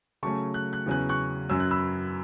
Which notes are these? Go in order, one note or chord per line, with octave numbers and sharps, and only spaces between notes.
C#3 F#3 A3 C#4 A5 C#6
F#6
F#6
E2 C#3 F#3 C#4 F#6
C#6 F#6
F#2 F#3 C#4 E6
F#6
B5 E6